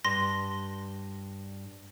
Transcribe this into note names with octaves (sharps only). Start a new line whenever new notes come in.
G2 C6 A#6